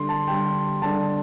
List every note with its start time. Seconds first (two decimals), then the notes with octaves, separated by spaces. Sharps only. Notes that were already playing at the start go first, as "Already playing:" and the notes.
Already playing: D3 G3 D4 C6
0.09 A5
0.27 D3 G3 D4 G5
0.82 D3 G3 D4 A5